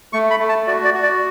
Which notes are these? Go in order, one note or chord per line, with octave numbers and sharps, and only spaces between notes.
A3 C#6
B5
A3
A5
F#4 D5
D5
F#4
D5